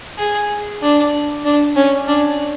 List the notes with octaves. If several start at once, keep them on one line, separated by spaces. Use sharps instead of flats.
G#4
D4
D4
C#4
D4